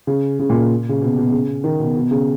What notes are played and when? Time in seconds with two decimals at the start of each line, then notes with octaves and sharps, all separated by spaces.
0.07 C#3
0.39 C#3
0.50 A#2
0.89 C#3
1.02 B2
1.17 B2
1.32 C#3
1.64 D#3
1.80 B2
1.96 B2
2.11 C#3